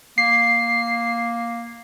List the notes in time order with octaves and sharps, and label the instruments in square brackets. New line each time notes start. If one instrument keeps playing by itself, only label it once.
[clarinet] A#3 [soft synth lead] C7